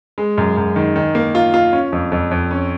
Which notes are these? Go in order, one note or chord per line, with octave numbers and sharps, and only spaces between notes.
G#3
F#2
F#2
D#3
D#3
A#3
F4
F4
C#4
F2
F2
F2
C#4